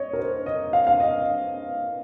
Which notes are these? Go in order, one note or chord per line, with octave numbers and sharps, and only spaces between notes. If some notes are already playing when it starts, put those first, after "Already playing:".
Already playing: C#5 D#5
A#4
C5
D#5
F5
F5
D#5